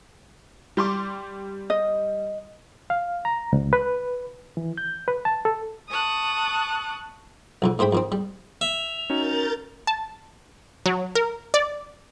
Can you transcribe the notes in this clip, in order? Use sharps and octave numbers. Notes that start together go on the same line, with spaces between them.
G3 C6 D6
D#5
F5
A#5
C#2
B4
E3
G6
B4
A5
A4
A5 C#6 D#6 F#6
B1 F2 D3
G#2 A3 C5 G5 B5
F2 D#3 C4
G3
E5 F7
C#4 D#4 F#4 A#4 G6 A6
A5
F#3
A#4
D5